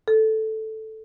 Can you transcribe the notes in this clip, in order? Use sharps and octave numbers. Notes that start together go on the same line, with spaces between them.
A4